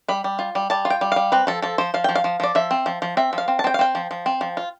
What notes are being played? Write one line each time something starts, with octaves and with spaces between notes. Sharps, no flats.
G3 B5
G3
F4
G3
G3 A5
F4
G5
G3
G3 F5
C4 B4
F3 A4
F3 A4
F3 C5
F3 F5
F3 G5
F5
F3
F3 D5
F3 E5
C4
F3
F3
C4 E5
F3
F5
C4
A5
C4 G5
F5
C4 G5
F3
F3
C4
F3
F4